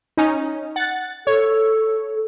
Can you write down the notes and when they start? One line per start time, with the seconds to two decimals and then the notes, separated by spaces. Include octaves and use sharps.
0.17 C#4 D#4
0.76 F#5 A6
1.27 A4 C#5